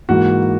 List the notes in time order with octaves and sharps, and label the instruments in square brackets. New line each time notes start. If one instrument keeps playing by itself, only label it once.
[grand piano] G#2 E3 A#3 F#4